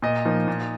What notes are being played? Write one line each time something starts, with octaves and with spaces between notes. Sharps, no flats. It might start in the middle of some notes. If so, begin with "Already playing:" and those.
A#2 D#5
F3 A#3 D#4
A#2